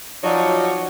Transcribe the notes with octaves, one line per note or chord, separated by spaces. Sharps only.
F3 F#3 D#4 F#4 C#5 D5